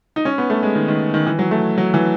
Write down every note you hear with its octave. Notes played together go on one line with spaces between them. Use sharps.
D#4
C#4
B3
A3
G#3
D#3
D#3
D#3
E3
F#3
A3
F#3
E3